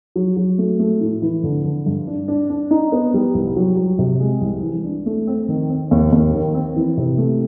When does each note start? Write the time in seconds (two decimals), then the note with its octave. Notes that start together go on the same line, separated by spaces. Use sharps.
0.16 F#3
0.37 F#3
0.58 A3
0.79 A3
1.00 A2
1.22 E3
1.44 D3
1.64 D3
1.86 G2
2.07 D4
2.28 D4
2.50 D4
2.71 D#4
2.92 B3
3.14 G3
3.34 C2
3.56 F#3
3.77 F#3
3.99 C3
4.20 G#3
4.41 C2
4.63 E3
4.84 D4
5.06 A3
5.27 C4
5.48 D#3
5.69 C4
5.91 D#2
6.12 D#2
6.33 D#3
6.54 C4
6.76 E3
6.97 C3
7.18 A3